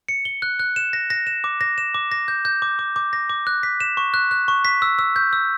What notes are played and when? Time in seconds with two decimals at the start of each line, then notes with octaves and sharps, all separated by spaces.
0.08 C#7
0.25 G7
0.42 F#6
0.60 F#6
0.76 E7
0.93 A#6
1.10 A#6
1.27 E7
1.44 D6
1.61 A#6
1.78 E7
1.95 D6
2.12 A#6
2.28 G6
2.45 G6
2.62 D6
2.79 D6
2.96 D6
3.13 A#6
3.30 D6
3.47 F#6
3.63 B6
3.80 E7
3.97 C#6
4.14 F#6
4.31 F#6
4.48 C#6
4.65 B6
4.82 E6
4.99 E6
5.16 G6
5.33 E6